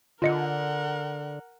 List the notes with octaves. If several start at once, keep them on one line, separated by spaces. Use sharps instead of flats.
D3 F4 A#4 D#5 F#5 C#7